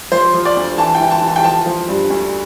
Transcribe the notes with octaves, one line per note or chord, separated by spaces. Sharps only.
F3 C5
F3
D5
D2
E3 A5
G5
E3
A5
E3
A5
G5
F3 A5
F3
G2
D2